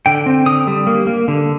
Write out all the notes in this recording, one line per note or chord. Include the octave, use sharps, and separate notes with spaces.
D3 G5
C4
D3 D#6
G3
A#3
A#3
D3